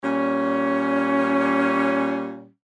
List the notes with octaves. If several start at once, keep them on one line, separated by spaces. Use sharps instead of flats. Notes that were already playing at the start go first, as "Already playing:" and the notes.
A#2 G3 C#4